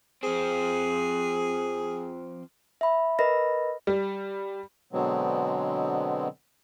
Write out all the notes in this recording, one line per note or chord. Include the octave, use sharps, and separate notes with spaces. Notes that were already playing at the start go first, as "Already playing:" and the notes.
F3 C4 G#4
E5 B5
A#4 B4 D#5 B5 A#6
G3
B2 D3 F#3 G#3 B3 C4